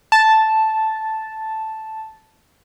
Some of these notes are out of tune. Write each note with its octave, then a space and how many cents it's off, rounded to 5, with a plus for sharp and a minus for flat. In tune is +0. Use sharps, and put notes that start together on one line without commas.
A5 -5